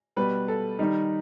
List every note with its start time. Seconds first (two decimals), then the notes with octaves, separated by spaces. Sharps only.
0.16 B2 G3 B4
0.48 A4
0.79 D#3 G3 D#4